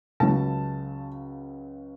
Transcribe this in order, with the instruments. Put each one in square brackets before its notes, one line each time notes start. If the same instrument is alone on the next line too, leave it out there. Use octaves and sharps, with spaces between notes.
[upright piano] C#2 C#3 F#3 A5